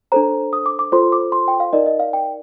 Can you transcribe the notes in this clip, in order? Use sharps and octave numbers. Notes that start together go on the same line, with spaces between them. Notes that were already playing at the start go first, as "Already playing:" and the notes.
D4 A4 C5 A#5
D#6
D6
D6
F4 A4 C5 C6
D6
C6
G5
F5
D#4 A#4 D5 D#5
D#5
F5
G5